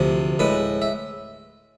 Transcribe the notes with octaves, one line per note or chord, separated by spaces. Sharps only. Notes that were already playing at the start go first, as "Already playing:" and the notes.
Already playing: D2 C3 F3
A2 G#3 B4
E5